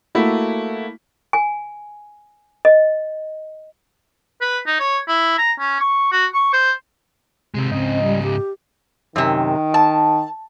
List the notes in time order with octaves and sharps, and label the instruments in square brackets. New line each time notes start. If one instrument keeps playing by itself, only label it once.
[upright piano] A3 A#3 E4 F#4
[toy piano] G#5
D#5
[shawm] B4
D#4
C#5
E4
A#5
C#4
C#6
F#4
C#6
C5
[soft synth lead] C3 [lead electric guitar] G#3 C4
[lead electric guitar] G#2 C#3 [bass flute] C4 [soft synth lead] D#5
[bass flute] G3
G4
[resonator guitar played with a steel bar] F#2 C3 [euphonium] D#3
[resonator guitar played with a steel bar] A5